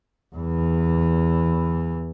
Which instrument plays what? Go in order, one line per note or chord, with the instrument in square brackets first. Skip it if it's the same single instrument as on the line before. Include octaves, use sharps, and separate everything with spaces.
[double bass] E2 E3